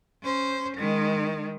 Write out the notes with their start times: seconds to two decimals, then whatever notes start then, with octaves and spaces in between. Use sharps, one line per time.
0.23 C#4 C5
0.78 D#3 G#3